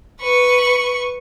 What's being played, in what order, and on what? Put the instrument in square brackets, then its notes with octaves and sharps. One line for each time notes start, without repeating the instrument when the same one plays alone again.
[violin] B4 C#6